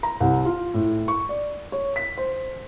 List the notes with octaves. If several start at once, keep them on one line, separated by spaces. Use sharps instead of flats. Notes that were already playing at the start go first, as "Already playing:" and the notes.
A#5
C2
F4
A2
C#6
D5
C#5
B6
C5